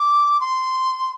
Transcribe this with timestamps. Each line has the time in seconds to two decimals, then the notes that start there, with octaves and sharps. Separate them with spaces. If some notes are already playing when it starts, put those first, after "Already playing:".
Already playing: D6
0.40 C6